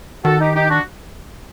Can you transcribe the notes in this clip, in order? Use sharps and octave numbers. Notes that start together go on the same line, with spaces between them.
D#3 F#4 A4
D#4 G4
D#4 G4
D4 F#4